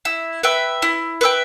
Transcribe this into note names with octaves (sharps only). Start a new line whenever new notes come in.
E4
B4 E5 G5
E4
B4 E5 G5